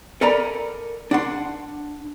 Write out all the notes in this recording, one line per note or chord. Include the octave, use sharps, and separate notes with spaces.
A4 A#4 D5 G#5 A#5 B5
D4 F#5 C6